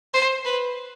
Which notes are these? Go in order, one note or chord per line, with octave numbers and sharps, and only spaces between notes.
C5
B4